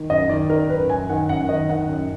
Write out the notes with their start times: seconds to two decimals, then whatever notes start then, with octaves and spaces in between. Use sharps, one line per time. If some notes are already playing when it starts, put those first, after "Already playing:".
Already playing: D#3
0.10 F#2 D#5
0.29 D#3 D5
0.49 D#3 A#4
0.70 F#2 B4
0.90 F#2 G#5
1.09 D#3 F#5
1.29 F#2 F#5
1.49 D#3 D#5
1.69 D#3 F#5
1.89 F#2